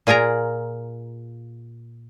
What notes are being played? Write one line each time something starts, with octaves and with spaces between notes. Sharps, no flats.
A#2 F4 G#4 A#4 A#5